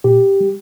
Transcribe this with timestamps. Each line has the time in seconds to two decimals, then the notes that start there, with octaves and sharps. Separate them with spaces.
0.04 A#2 G4
0.41 G3